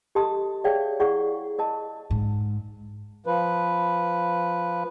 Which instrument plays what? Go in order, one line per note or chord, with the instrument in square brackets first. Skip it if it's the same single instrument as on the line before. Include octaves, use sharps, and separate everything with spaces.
[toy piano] G4 A4 D#5 A5 C6 D#6
G#4 C#5 D5 E5 F5 G5
E4 G#4 D5 F#5 C#6
A#4 D#5 A5
[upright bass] G#2
[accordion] F3 B4